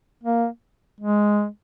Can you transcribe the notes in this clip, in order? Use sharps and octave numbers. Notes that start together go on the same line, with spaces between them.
A#3
G#3